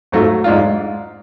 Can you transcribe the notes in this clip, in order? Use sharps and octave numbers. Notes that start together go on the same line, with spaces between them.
G#2 F#3 A3 F4
G#2 G#3 D4 F4